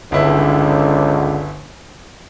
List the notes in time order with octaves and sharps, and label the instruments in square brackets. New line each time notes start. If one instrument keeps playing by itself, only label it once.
[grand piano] G1 E4 E5 [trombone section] C#2 D3